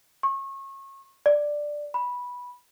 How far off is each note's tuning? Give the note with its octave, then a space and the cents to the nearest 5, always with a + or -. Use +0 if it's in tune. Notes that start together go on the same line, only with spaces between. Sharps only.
C#6 -30
D5 +5
B5 -10